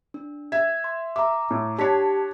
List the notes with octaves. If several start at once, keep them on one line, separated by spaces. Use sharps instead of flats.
D4
E5 G#6
C6
E5 A#5 D6
A2
D4 G4 C#5 A5 B6